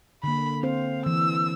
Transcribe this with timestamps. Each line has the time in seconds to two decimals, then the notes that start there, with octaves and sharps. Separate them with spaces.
0.24 D3 A#3 B5
0.63 C4 C5 F5
1.06 E3 E6